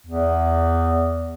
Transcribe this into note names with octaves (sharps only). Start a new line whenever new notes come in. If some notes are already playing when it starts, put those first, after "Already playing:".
E2